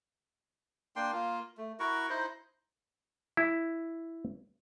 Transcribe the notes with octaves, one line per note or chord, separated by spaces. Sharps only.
A#3 D4 G5 C6
A#3 F4
A3
E4 F#4 A#4 C#6
D#4 E4 C5 D#5
E4